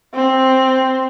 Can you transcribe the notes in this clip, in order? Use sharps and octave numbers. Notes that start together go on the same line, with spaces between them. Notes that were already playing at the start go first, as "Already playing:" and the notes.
C4